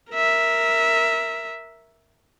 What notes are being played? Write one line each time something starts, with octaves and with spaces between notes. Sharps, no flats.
A#4 E5